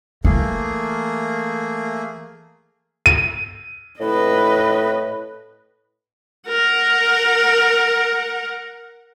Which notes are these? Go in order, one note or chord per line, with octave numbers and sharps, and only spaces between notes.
E3 A3 A#3 G#4
D#7
A2 B4 D#5
A#4 F#5